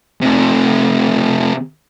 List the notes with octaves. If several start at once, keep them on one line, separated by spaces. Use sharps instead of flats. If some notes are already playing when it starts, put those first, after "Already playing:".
C3 A3